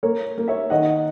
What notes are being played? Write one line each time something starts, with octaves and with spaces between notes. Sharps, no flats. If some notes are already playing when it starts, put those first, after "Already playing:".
A#3 A#4 C#5
A#3
C#5 E5
D#3 D#5 F#5